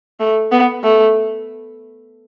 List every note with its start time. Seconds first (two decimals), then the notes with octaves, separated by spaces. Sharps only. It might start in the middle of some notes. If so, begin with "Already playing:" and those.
0.20 A3
0.52 B3
0.83 A3